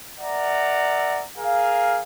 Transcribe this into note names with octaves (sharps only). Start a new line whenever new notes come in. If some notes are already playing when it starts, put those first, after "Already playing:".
A#4 D5 E5 F#5 A#5
G#4 A#4 F5